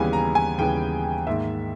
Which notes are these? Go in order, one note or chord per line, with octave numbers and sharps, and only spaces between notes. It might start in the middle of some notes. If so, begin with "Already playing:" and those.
Already playing: D#2 C#3 E3 G3 B3 G#5
A#5
G#5
D#2 C#3 E3 G3 B3 G5
G#2 D#3 A#3 E5